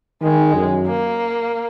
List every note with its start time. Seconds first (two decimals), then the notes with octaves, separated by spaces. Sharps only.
0.22 D#3 G#3
0.55 F#2
0.86 A#3